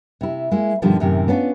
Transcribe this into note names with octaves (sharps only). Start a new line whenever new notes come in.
C3 E4
G#3 A#3 E4
G2 B2 D3 D#3 F3 G3
F#2 A2 C3 D#3
B3 C#4 D4 F4